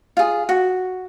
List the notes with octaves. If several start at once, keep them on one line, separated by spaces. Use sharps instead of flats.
F4 G#4
F#4